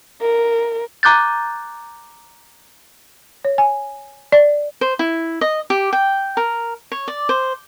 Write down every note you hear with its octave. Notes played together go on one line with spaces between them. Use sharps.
A#4
A#5 D6 F#6 G6 A6
C#5
G#5
D5
C5
E4
D#5
G4
G5
A#4
C#5
D5
C5